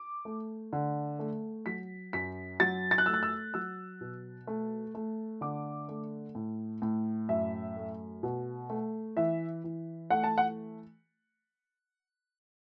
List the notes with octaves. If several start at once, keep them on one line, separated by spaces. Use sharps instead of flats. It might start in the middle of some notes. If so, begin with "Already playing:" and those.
Already playing: D6
A3
D3
A3
F#3 B6
F#2 B6
F#3 A6
A6
F#6
A3 E6
F#6
E6
F#3 E6
B2
A3
A3
D3 D6
A3
A2
A2
F#2 E5
A3
B2
A3
E3 E5
E3
A3 F#5
A5
F#5